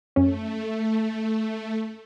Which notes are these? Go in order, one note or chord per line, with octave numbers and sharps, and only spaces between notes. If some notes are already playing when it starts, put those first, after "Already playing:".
F#2 A3 C#4